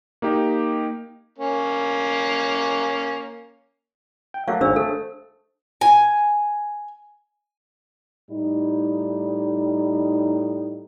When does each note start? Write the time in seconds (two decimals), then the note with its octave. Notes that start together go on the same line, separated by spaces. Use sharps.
0.22 A#3 D#4 G4 D#5
1.38 A#3 C#4
4.34 G5
4.48 F#3 A3 A#3 F5
4.61 G#1 D4 C5 C#5 E6
4.76 A3 A4
5.81 G#5
8.31 A2 G3 D#4